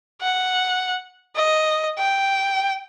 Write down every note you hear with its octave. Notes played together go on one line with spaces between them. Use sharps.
F#5
D#5
G5